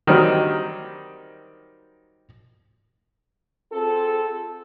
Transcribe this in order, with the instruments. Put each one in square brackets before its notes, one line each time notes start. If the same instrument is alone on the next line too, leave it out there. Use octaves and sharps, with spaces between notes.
[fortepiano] D#3 F#3 G3 C4
[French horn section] C4 F4 G#4 A4